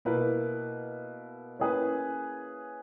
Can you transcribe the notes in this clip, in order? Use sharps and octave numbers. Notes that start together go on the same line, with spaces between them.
B2 A#3 E4 B4
A#3 C#4 E4 G#4 B4